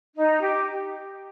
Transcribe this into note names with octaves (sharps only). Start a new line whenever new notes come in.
D#4
G4